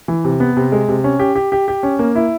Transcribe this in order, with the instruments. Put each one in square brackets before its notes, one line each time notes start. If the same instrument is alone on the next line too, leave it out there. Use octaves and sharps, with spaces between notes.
[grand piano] E3
C3
B3
C3
G#3
C3
C#4
G4
G4
G4
G4
C#4
A#3
E4